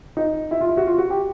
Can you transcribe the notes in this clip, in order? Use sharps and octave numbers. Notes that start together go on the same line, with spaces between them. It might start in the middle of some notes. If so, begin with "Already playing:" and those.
D#4
E4
F4
E4
F#4
F4
F#4
G4